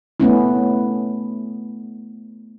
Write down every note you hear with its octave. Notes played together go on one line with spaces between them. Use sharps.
A3 B3 C#4 E4